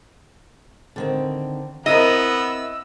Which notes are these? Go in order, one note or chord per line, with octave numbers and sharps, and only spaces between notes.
D3 D#3 C4
B3 C4 E4 A#4 D#5 E6